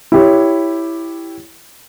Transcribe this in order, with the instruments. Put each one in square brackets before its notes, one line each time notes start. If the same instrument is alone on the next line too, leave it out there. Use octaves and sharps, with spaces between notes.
[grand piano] E4 G4 C#5